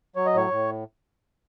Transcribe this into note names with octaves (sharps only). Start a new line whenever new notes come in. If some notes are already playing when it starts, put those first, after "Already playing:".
F#3 C#5
D#5
A2 C#5
A2